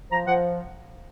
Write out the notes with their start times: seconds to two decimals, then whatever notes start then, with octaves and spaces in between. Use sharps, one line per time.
0.11 F3 A#5
0.27 F3 F#5